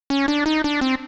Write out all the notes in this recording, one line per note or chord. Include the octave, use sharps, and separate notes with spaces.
C#4
D4
D#4
D4
C4